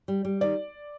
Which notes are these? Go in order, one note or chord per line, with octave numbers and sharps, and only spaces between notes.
G3
G3
D#3 D5